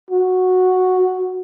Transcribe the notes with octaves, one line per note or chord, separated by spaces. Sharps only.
F#4